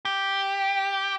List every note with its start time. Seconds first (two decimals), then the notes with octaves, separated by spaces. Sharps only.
0.05 G4